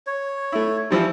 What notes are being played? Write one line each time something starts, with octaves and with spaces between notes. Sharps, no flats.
C#5
A3 E4
E3 F3 G3